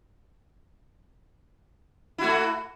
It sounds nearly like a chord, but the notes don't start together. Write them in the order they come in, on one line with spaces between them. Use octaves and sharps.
E4 F#4 A3